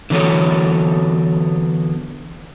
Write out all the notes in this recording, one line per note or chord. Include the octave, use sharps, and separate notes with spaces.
D3 E3 F#3 B3 A4 C#5